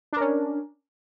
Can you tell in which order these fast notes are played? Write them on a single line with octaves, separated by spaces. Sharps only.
D4 A#4 C#4